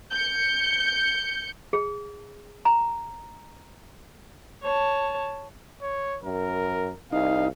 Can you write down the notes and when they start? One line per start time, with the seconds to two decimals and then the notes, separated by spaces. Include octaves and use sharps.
0.11 G6 C#7
1.73 G#4
2.65 A#5
4.63 C#5 A5
5.82 C#5
6.24 F#2 A#4
7.12 C2 D#4 F5